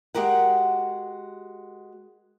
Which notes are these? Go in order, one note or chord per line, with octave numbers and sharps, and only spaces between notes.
G#3 F#4 G4 A#4 F#5